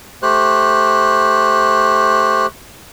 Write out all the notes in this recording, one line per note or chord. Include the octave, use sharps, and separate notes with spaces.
A3 G4 C5 F#6